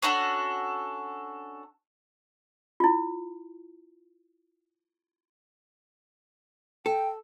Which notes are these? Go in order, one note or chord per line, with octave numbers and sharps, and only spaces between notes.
C#4 D4 F#4 A4
E4 F4
A4 G5